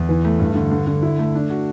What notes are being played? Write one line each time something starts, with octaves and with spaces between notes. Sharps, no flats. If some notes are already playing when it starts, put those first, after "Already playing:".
Already playing: E2
E3
A3
G2
D3
D3
D3
E4
A3
D4
F#4